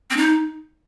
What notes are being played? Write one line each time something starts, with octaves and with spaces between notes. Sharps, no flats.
C4
D#4